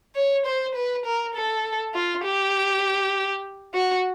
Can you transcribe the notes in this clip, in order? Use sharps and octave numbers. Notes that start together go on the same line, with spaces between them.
C#5
C5
B4
A#4
A4
F4
G4
F#4